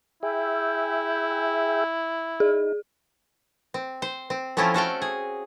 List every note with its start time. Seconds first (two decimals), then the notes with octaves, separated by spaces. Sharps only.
0.23 E4 G#4 E5 G5
2.40 D#4 G#4
3.74 C4
4.02 C5
4.30 C4
4.57 F3 A3 C4 C#4 E4 F4
4.74 F#4 A4 F5 G5
5.02 G#4